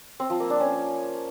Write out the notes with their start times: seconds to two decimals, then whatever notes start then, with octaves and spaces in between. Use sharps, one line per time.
0.20 C4
0.30 F3
0.40 A#3
0.50 D4
0.60 C#4